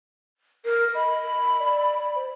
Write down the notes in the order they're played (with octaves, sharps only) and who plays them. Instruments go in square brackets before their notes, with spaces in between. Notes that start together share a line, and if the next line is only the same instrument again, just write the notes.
[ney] A#4
[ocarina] D#5 [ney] B5
[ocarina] D5
C5